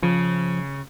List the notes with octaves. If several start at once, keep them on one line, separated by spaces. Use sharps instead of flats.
C#3 F3